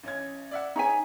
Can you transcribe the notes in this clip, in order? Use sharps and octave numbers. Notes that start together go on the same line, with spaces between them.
A1 C#4 G#6
D5 E5 F#5
D#4 G#4 C#5 G#5 B6